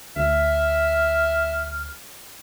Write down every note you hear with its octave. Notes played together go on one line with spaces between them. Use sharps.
D2 E5 F6